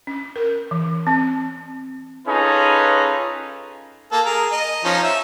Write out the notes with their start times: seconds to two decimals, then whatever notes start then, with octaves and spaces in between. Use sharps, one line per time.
0.07 C#4
0.36 A#4
0.71 E3
1.07 C4
2.27 C#4 D#4 F4 G#4 A4 B4
4.12 A#3 A4
4.26 G#4 A#4
4.52 D#5
4.85 F3 C#4 D#4
5.04 E5